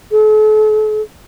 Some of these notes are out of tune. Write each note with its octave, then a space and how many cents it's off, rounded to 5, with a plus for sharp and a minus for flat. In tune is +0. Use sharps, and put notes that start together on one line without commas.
A4 -40